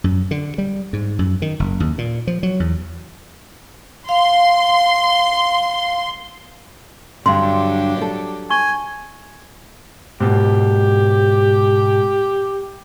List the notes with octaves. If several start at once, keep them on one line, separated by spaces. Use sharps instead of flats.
F#2
D3
G3
G#2
F#2
D#3
F#1
D#2
A#2
F3
F#3
E2
F5 C6
G2 D3 F#3 D4 G4 C6
A4 D5
G#5 C#6
G#2 B2 G4